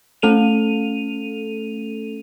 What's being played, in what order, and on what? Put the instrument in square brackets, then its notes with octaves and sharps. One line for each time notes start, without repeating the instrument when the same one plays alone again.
[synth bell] A3 C#4 A4 D#7 F7